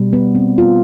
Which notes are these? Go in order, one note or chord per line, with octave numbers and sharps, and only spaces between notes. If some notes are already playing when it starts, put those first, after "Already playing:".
Already playing: B2 G3
B3
C4
F4